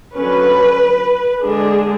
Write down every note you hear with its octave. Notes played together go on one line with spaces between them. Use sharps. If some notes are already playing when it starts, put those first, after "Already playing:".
D3 F#3 C#4 B4
D3 G#3 D4 G#4